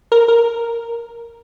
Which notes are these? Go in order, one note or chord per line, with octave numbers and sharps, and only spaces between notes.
A#4
A#4